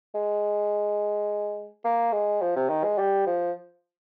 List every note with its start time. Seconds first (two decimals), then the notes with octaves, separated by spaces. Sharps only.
0.15 G#3
1.84 A#3
2.13 G#3
2.41 F3
2.56 C3
2.69 D#3
2.84 G#3
2.98 G3
3.26 F3